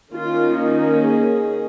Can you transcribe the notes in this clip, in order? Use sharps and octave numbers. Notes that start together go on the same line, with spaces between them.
D#3 A#3 C#4 F4
D#4
G#4